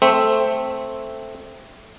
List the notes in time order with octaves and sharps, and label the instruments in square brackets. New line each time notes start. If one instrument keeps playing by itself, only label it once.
[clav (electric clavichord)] A3 C4 C5 E5